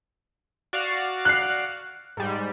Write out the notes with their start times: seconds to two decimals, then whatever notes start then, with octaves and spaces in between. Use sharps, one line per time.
0.73 F#4 D5 F5
1.25 F#6 C7
2.17 G#2 G3